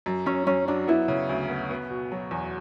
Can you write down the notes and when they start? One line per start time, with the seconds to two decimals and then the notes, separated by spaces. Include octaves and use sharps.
0.06 F#2
0.26 F#2 C#4
0.47 F#2 C#4
0.68 F#3 D4
0.87 B3 E4
1.08 C#3
1.29 D2
1.49 B3
1.70 B3
1.90 B2
2.12 F#3
2.31 E2